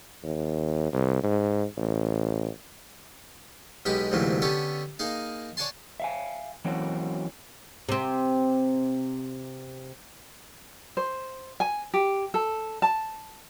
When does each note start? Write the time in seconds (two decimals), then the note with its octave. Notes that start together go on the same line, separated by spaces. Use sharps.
0.24 D#2
0.93 C2
1.23 G#2
1.77 A1
3.85 B1 B2 G#3 G4 B5
4.12 D2 G#2 C3 E3 F#3 A#3
4.42 D3 B3 C#4 G4 A4 C#5
4.99 A#3 D#4 G#4 F5
5.57 C#5 D5 F#5 G#5 A5 C6
6.00 E5 F5 G#5
6.65 E3 F#3 A#3 C4 C#4 F#4
7.89 C3 C4
10.97 C5
11.60 G#5
11.94 G4
12.34 A4
12.82 A5